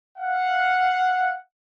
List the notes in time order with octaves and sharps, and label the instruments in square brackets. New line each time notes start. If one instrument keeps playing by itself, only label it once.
[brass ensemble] F5 F#5